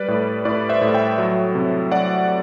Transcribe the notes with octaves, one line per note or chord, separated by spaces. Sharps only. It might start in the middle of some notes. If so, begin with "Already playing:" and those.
Already playing: G3 B4 D5
A2
A2 B4 D5
C5 E5
A2
E5 G5
F#3
C3
F#3 D5 F#5